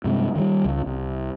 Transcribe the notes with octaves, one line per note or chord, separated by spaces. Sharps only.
G2 C3 G#3
D#3 E3 G3
C#2
C2